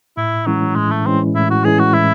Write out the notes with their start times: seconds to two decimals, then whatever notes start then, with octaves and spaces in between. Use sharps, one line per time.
0.17 A2 E4
0.46 E3 F#3 G#3 C#4 E4
0.76 A2 G#3
0.91 A3
1.06 E3 G#3 C4 C#4 E4
1.35 A2 E4
1.50 F#4
1.64 E3 G#3 C#4 E4 G#4
1.79 F#4
1.94 A2 E4